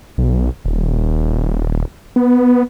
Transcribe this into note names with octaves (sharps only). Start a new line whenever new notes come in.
B1
D#1
B3